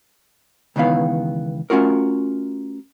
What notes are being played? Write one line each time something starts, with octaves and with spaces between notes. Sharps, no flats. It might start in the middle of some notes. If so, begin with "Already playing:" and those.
C#2 D#3 E3 B3 F5
A3 C#4 F4 F#4 A#4